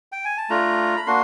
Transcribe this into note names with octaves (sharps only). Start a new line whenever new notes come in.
G5
G#5
A5
A3 D4 F4 A#5
B5
A#3 D4 F#4 C6